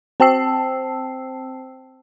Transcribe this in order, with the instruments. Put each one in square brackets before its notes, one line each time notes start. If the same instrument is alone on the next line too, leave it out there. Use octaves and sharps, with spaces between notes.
[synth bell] C4 C5 G5 A5 E6 C7